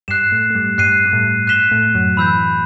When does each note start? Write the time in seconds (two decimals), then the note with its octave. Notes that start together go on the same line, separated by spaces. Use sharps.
0.08 G2 G3 F#6 C7 E7
0.31 A2 A3
0.50 A3
0.55 G2 G3
0.78 G2 G3 F#6 C7 D#7
1.05 G3
1.13 A2 A3
1.47 F#6 B6 E7 G7
1.72 A2 A3
1.95 F#2 F#3
2.17 E3 B5 E6 G6 B6